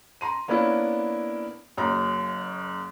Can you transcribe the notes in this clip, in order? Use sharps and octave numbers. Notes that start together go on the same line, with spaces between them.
A#5 C6 D#7
A#3 B3 C#4 D4 E4
F#1 F#2 A#5